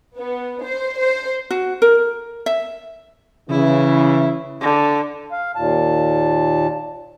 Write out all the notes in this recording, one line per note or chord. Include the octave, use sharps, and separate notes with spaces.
B3
C5
C5
F#4
A#4
E5
C#3 E3 E4
D3
F5
D#2 A#2 A5